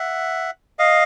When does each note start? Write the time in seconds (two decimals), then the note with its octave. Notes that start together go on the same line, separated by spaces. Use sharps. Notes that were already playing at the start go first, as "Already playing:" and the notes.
Already playing: E5 F#5
0.79 D#5 F5